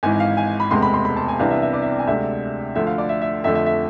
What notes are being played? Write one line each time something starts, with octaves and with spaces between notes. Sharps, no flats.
G#1 G#2 E3 G#5
F5
G#5
B5
E1 D2 C3 G#3 C6
B5
C6
B5
A5
G#5
C2 C3 E3 B3 D4 F5
E5
E5
D5
E5
G#5
D2 C3 G#3 D4 E5
D2 D3 F3 A3 E5
F5
D5
E5
E5
F2 D3 F3 A3 E5
E5
E5